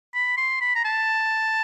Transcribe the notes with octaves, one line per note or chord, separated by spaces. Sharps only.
B5
C6
B5
A#5
A5